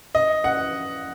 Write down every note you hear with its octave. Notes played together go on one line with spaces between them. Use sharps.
D#5
F#5